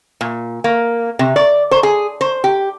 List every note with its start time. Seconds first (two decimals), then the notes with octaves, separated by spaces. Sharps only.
0.21 A#2
0.64 A#3
1.19 C3
1.36 D5
1.71 C5
1.83 G#4
2.21 C5
2.44 G4